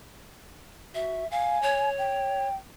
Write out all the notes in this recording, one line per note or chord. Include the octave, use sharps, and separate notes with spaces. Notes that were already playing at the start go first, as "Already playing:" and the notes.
F#4 E5
F5 G#5
C#5
G5